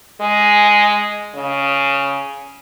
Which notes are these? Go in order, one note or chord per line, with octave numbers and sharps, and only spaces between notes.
G#3
C#3